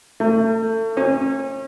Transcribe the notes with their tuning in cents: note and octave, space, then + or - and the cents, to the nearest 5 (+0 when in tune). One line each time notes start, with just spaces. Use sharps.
A3 +30
C#4 -40